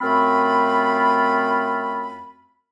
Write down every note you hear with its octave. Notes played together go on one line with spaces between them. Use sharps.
F#2 A3 C4 F4 B5